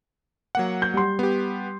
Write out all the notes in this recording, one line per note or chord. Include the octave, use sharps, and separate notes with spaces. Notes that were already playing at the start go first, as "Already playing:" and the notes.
F#3 A#3 F#5
G6
G3 C6
B3 G4